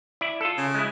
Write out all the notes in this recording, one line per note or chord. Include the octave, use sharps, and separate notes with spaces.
E4 D5
F4 A4
C#3
G#3 E4